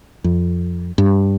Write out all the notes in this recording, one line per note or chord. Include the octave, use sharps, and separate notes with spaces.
F2
G2